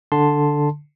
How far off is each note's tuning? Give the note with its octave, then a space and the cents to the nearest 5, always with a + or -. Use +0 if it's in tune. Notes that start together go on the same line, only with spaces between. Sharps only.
D3 +0 A5 +0 C6 +0